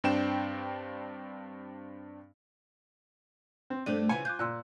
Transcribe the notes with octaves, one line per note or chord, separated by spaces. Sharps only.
G2 C4 D4 G5 E7
C4
G2 A3 D4 C5 D#7
C#3 E3 F4 G#5 C#7
F4 D6 F#6 G6
A#2 C6 E6 F#6